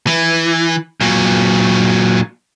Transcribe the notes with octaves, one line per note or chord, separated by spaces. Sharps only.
E3
A#2 F#3